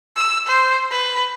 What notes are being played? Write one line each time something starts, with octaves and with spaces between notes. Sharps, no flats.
E6
C5
B4